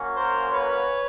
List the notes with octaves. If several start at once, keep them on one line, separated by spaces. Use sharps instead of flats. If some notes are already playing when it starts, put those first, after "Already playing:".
Already playing: A#3 C#4 F#4
A#4 C5
B4 C#5